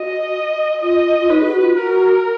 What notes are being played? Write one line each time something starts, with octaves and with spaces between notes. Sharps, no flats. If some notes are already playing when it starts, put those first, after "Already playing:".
Already playing: F#4 D#5
F4 D#5
F4
D#4 B4
G#4
F#4
F4
F#4 A#4